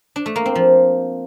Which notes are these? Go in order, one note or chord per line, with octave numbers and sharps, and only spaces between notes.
D4
A3
A#3
C4
F3